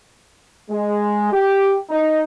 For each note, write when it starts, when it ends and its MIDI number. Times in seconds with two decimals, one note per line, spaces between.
0.70 1.29 56
1.31 1.75 67
1.90 2.21 63